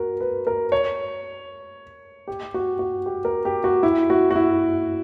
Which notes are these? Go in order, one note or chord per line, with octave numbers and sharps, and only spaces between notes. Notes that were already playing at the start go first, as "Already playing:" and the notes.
Already playing: F#4 A#4
B4
A#4
C#5
G4
F#4
F#4
G4
A#4
G4
F#4
E4
F#4
F#4
E4